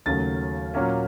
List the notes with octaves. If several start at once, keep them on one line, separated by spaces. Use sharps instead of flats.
D#2 C#3 F#3 A3 A6
A#2 F#3 A#3 C#4